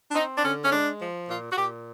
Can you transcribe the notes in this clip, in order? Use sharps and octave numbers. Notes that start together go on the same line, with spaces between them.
D4
C4 D#4
D4
D3 C#4
C#4
G#3 D4
F3
A#2 F4
F#4
A#2 G4